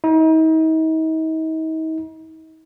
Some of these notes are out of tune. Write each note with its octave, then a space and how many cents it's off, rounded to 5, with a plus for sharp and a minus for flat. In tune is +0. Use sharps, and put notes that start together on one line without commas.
D#4 +40